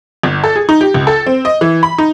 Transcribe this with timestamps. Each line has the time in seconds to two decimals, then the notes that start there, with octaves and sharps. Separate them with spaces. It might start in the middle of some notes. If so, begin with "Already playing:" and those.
0.23 G1
0.44 A4
0.56 G#4
0.69 D#4
0.81 G4
0.94 C#2
1.07 A4
1.26 C4
1.45 D#5
1.61 E3
1.83 B5
1.98 D#4